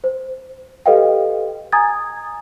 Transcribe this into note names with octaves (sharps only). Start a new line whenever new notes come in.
C5
G4 A4 B4 D#5 F5 G5
G#5 A#5 D#6 G#6 A6